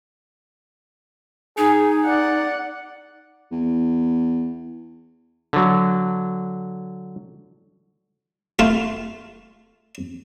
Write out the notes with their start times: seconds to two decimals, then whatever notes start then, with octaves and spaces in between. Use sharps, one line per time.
1.58 D#4 G#4
2.06 D5 F#5
3.52 E2
5.53 D3 F#3
8.59 A3 F4